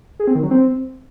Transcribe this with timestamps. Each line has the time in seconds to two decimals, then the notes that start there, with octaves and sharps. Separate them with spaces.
0.20 G#4
0.27 C4
0.35 D#3
0.43 F#3
0.51 C4